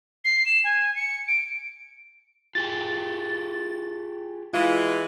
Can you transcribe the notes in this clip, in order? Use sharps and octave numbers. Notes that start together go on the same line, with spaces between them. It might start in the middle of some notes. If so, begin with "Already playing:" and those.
C7
E7
G#5
C#7
D7
F4 G4 G#4 A6
E3 G#3 F4